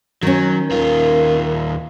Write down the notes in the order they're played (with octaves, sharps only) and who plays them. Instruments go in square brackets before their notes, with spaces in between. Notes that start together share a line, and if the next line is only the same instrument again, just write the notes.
[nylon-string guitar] D#3 C#4 [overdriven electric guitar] F#3
[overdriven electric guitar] D#2 F4 [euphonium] A#4